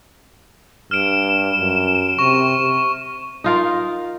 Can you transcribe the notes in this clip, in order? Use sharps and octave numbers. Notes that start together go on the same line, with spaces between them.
G2 F6 D7 E7
F#2
C3 C#6
C3
D#4 F4 A#4